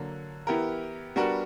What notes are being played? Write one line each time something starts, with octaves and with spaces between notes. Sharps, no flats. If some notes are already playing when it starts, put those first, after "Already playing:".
Already playing: D3 F#3 A#3
E3 B3 E4 G4 A#4
G3 B3 D4 F#4 A#4